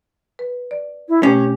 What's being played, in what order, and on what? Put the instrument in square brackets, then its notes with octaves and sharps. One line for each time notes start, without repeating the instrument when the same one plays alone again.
[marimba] B4
D5
[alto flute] E4
[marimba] B2 A3 [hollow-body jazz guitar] C#4 [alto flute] G4